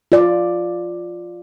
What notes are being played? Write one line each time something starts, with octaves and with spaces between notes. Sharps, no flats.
F4 D5